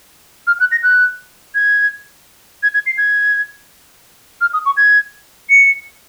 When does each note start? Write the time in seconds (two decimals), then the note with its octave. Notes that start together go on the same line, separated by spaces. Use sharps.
0.47 F6
0.60 F#6
0.72 A#6
0.83 F#6
1.55 G#6
2.63 G#6
2.74 G#6
2.86 C7
2.98 G#6
4.41 F6
4.53 D#6
4.66 C#6
4.77 G#6
5.50 C#7